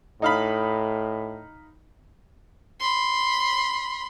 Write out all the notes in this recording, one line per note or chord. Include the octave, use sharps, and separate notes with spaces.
A2 D#4 F5 B5
B5 C6